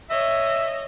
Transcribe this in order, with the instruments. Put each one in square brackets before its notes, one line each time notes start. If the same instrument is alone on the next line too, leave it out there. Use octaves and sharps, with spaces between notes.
[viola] C#5 D#5 [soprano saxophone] E5